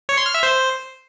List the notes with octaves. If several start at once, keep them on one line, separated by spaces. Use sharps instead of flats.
C#5
C6
F6
E5
C5